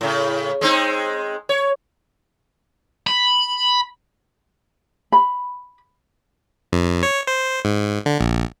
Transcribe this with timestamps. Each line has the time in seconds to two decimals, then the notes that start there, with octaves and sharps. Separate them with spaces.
0.01 A2 C#3
0.61 G#3 C4 D#4
1.49 C#5
3.07 B5
5.12 B5
6.73 F2
7.03 C#5
7.27 C5
7.65 G#2
8.06 D3
8.20 A#1